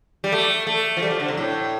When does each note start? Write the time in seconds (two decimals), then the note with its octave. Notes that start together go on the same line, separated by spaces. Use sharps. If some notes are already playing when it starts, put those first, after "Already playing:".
0.24 G3
0.32 A3
0.67 A3
0.97 F3
1.03 G3
1.11 F3
1.20 D3
1.28 C3
1.37 A2